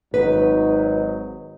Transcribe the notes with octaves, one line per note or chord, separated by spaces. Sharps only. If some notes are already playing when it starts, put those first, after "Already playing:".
G#1 F#3 D#4 B4